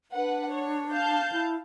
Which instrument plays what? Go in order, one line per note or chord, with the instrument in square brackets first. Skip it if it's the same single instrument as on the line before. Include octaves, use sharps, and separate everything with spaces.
[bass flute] D4 [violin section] B4 F#5
[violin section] C#5
F5 A5 G6
[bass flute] E4